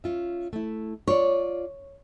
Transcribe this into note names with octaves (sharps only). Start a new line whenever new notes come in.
C#4 F4 E5
A3 E4
F4 C#5 D5